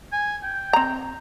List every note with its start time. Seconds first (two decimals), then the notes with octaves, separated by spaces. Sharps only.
0.12 G#5
0.44 G5
0.73 C4 A#5